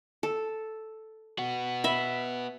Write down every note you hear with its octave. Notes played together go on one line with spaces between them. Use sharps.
A4
B3 F#4
E5 B5